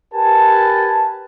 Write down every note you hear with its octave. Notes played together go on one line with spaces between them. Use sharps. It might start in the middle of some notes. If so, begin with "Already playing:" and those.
G4 A#4 B4 G#5 A5